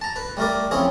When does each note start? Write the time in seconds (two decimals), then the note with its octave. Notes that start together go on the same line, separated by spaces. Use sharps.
0.01 A5 A#5
0.16 B4
0.37 G3 A3 A#4 D5
0.71 F3 C4 C#4 E4 G#4